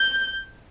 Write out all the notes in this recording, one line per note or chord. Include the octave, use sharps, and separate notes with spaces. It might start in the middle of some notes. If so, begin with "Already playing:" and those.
Already playing: G6